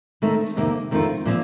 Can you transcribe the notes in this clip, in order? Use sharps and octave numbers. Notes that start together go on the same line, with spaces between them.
D#3 A3 C4 D#4
F2 C3 D#3 A#3
F2 D#3 A3 C4 F4
A#2 F3 C4